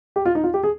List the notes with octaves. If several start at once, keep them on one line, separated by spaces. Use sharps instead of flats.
G4
F4
D#4
F4
G4
G#4